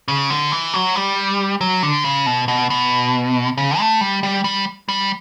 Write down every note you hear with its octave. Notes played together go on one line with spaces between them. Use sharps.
C#3
D3
E3
F#3
G3
F#3
D3
C#3
B2
B2
B2
C#3
A3
G3
G3
G3
G3